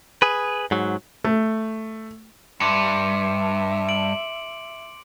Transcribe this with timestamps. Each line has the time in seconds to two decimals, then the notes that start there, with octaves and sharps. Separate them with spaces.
0.22 G#4 B4
0.71 G#2 F#3
1.24 A3
2.60 G2 E5 C6 D6 C#7
3.89 D7 F#7